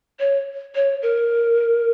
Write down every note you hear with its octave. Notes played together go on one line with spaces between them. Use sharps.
C#5
C#5
A#4